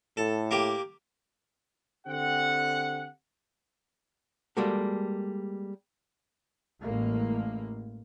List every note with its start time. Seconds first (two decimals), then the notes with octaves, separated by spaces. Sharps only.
0.17 A2 A4
0.51 A#3 G4
2.07 D3 C4 G4 F#5
4.57 G3 G#3 A#3 F#4 A4
6.81 A1 A2 G#3 A#3